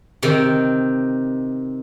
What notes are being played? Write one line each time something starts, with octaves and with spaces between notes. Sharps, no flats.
C3 D#3